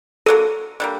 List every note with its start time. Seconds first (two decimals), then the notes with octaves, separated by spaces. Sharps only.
0.26 D3 F#3 A#3 A4
0.80 D3 G3 A#3